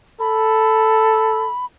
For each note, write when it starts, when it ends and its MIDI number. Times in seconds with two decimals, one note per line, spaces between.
0.20 1.49 69
0.20 1.65 83